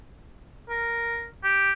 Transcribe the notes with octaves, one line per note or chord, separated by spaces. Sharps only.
A#4
G4